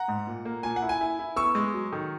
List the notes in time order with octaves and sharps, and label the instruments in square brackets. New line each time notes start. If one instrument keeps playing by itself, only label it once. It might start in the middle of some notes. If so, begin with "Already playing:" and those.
Already playing: [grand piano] F#5 A#5
G#2
A#2
A#3
A#2 G#5
F#5
E4
G#5
E4
E4
B3 C#6 E6
G#3
F#3
D#3